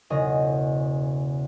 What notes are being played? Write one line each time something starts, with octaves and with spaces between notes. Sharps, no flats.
E1 C#3 D#5